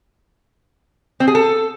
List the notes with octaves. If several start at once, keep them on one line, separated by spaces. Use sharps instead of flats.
C4
G#4
A4